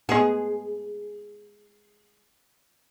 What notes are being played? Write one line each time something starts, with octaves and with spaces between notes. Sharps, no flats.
G#3 B3 G#4